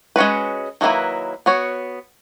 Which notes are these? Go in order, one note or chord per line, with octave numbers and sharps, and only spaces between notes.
G#3 C#4 F#4 B4
D#3 F#3 A#3 E4 B4
B3 F#4 C#5